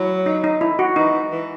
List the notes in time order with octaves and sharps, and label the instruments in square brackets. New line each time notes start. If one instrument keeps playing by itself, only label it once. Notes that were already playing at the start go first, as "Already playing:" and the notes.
Already playing: [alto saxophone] F#3 [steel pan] E4
[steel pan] D#4
D#4
E4
F#4
[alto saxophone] E3 [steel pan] D#4
[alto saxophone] E3